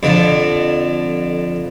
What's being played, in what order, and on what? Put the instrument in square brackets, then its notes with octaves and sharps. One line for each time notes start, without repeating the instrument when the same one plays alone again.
[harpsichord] F2 D3